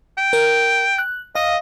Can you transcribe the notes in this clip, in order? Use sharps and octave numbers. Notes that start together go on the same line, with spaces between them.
G5
A#4
F#6
D#5 F5